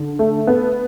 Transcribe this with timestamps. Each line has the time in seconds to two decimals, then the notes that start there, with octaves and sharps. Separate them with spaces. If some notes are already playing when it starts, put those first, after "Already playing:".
Already playing: D3
0.19 A3
0.47 B3